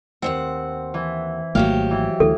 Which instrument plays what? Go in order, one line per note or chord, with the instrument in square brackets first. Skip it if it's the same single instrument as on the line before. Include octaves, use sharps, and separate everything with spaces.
[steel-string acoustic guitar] D#2 G#2 F#5 [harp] C4
[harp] E3
[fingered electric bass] G#1 A3 A#3 [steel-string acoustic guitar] D#3 F#3 G4 [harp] F5
[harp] E3
[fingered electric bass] D2 E3 [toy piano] A4